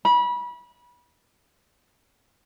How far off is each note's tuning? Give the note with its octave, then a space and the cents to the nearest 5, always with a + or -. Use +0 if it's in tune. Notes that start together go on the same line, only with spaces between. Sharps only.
B5 -30